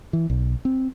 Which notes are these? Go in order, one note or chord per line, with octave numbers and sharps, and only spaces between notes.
E3
B1
C4